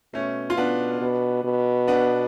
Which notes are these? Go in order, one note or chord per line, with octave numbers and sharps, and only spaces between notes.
B2 A3 C#4
F4
B3 D4
B2
B2
B3 D4